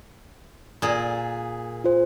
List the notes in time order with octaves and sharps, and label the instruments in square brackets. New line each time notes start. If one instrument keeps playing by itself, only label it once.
[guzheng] A#2 G#4
[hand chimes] F4 C5